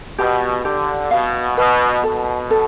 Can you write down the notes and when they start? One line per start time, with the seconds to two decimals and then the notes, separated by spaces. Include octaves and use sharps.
0.18 B2 G4
0.65 D3 G4
1.11 B2 F5
1.57 B2 B4
2.04 B2 A4
2.51 A4